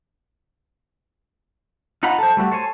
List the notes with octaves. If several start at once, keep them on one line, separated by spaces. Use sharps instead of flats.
D#4 F4 F#5 A#5 B5
A4 C5
G3 A3 F#4
A4 C5 C#5 G#5